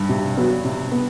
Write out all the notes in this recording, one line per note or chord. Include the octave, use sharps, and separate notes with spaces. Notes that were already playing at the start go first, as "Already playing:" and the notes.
Already playing: G2
C3
F#3 B3
C3
B3